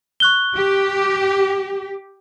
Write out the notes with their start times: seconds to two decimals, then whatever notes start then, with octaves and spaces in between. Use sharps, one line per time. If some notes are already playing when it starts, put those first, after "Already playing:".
0.20 C#6 F#6 G7
0.56 G4